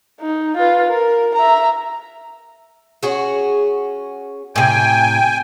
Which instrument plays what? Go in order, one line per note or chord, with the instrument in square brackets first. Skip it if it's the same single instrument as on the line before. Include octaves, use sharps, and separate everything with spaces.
[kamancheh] D#4
F4 B4
A#4
E5 A#5
[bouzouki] C#4 F#4 G#4
[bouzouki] A2 C3 [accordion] G5 G#5